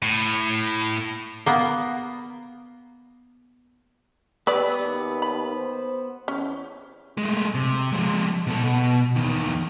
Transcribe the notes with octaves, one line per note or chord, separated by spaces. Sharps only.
A2
A#3 B3
B3 G4 B4 D5 E6
D#2
B5
C5
E2 C#4
G#3 A3
C3
F3 G#3
B2 A4
B2
E2 D#3